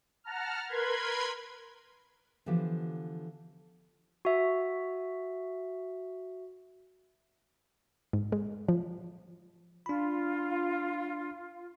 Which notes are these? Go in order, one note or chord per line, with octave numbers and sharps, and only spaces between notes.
F#5 A5 A#5 F6
A#4 B4 B5 C6 G#6
D3 E3 F3 B3 G4
F#4 E5
G#2
G#3
F3
D4 F4 B5